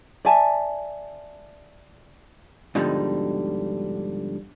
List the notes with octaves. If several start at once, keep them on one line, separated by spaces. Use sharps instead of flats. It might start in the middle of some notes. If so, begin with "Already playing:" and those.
D5 E5 G#5 A5
G#2 B2 D3 F3 G3 D#4